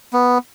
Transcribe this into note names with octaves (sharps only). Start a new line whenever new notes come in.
B3